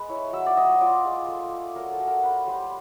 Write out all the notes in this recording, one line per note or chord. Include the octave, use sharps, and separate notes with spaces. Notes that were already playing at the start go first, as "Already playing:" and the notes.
Already playing: G#3 B4
E4 C#5
F#3 E5
D5
F#3 D#5
F4 D5
G#3
A3
A3
F#3 A#4
A4
F#3
A#4
B3 B4
G3 C5